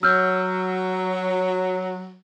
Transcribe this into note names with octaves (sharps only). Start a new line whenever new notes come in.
F#3 E6 F6 G6